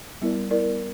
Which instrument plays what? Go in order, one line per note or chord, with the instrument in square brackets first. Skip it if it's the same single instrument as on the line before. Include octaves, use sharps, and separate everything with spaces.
[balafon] G3 B3 E4 A#4 D5
G3 B3 E4 A#4 D5